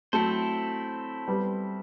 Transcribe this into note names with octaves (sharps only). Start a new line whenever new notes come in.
F#3 A3 C4 E4 A4 C5
G3 B3